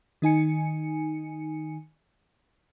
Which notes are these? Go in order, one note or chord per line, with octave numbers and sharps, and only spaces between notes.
D#3 D#4 G#5 C#7